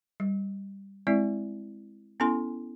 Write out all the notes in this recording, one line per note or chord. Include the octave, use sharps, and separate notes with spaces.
G3
G#3 C4 E4 D5
B3 C#4 E4 A4 G#5 C6